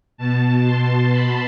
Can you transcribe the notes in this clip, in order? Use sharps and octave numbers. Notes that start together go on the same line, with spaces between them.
B2 A5
C6
B5